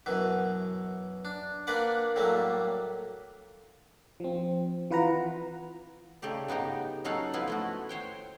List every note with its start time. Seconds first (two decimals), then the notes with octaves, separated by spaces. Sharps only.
0.06 F#2 B2 E3
1.25 D4
1.67 A#3 D4 B4 D5 F#5
2.16 A2 F#3 G3 A3 A#3
4.20 F3 C4
4.91 E3 F4 B4 F#5 A#5
6.22 C#3 A3 D#4 G4 D5
6.48 C#3 B3 D#4 G4 A#5
7.05 F#3 C#4 D#4 A4 F5 F#5
7.33 F3 B3 E4 F4 B4
7.48 A3 E4 F#4
7.89 C5 C#5 G5